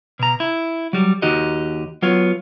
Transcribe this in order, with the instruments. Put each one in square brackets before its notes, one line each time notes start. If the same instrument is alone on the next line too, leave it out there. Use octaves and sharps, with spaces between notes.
[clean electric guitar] B2 A#5
E4
F#3 G3
D#2 D#4 F#4 G4 D#5
F#3 B3 F4 C#5